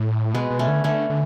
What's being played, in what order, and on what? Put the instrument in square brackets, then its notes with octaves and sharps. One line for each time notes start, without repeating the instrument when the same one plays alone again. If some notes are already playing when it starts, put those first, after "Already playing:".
Already playing: [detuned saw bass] A2
[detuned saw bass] B2 [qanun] G#3 B3
[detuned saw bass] B2
[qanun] A3 C#4
[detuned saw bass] D3
[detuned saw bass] D3 [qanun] A3 C#4
[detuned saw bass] D3